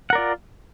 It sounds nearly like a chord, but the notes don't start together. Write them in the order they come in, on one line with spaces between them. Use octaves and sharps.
F#5 A#4 D5 F4